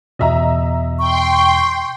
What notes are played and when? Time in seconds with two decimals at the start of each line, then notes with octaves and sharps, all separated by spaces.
0.19 E2 B2 D#5 E5 A#5
0.99 G5 C6 C#6